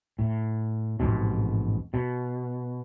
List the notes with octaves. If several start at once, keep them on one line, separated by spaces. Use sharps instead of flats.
A2
A1 F2 G#2 B2
B2